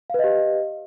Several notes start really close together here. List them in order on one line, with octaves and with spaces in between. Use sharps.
F5 B4 D#5 G4